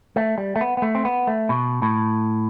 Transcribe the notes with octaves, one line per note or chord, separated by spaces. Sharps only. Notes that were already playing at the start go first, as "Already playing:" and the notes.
A3
G3
A3
B3
B3
A3
C4
B3
A3
B2
A2